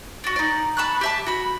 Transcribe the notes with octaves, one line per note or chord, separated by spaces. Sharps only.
D4 F#4
D#4 D5
A5 B5 C#6 F#6
G4 E5 A5
F#4 B5